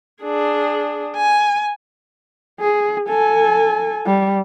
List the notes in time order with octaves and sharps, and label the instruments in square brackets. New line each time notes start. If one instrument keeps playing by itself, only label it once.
[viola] D4 G#4
G#5
[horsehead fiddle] G#4
A4 G#5
G3